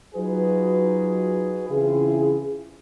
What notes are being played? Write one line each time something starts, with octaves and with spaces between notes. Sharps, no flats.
F#3 D#4 F4 F#4 G#4 B4
C#3 E3 C4 E4 F4 G#4